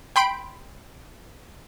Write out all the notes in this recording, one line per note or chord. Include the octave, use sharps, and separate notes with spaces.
G5 B5 C6 D7